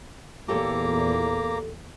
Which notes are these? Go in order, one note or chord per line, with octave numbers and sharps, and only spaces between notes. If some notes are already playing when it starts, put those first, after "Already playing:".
E2 A#2 A#3 G4 A4 C#5 A#5 D6